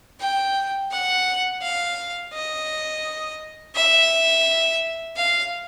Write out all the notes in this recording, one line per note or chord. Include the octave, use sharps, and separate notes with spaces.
G5
F#5
F5
D#5
E5
F5